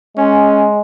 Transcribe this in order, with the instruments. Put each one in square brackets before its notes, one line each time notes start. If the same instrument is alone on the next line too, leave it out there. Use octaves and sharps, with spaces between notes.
[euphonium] G#3 [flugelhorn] C#4